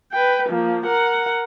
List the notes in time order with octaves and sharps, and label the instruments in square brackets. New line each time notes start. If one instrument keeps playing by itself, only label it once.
[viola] B4 G5
F3 A#3
A#4 F#5